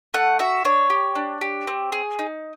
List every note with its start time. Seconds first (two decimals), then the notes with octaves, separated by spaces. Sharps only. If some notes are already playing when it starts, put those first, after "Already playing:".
0.14 A3 F#5
0.39 F#4 E5
0.65 D4 C#5
0.90 G4
1.15 D4
1.41 G4
1.67 C4
1.92 G#4
2.19 D#4